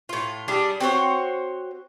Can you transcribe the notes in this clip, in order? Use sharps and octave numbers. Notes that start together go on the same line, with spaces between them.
A2 F4
G3 D4 G#4
C4 F#4 C5 C#5